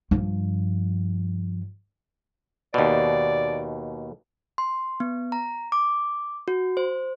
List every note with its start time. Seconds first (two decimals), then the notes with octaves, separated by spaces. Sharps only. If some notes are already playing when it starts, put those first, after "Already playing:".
0.11 G2 F3
2.74 D#2 B2 D5
4.58 C6
5.00 B3
5.32 A#5
5.72 D6
6.48 F#4
6.77 C5